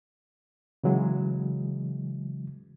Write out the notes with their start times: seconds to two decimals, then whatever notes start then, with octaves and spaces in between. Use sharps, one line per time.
0.84 C#3 E3 F#3 G#3